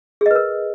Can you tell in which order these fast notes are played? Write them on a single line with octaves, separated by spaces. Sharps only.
G#4 D#5 B4 A#4